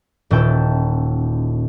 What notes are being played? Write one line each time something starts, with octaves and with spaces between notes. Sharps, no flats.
D#1 A#2 C#4 E4 G5 A5